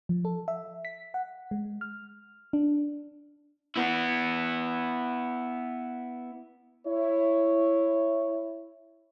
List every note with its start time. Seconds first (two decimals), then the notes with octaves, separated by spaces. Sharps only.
0.09 F3
0.25 A4
0.48 E5
0.85 B6
1.14 F#5
1.51 G#3
1.81 F6
2.53 D4
3.76 B3 E4
6.87 E4 C#5